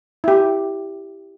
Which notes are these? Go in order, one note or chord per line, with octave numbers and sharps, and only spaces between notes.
E4 G4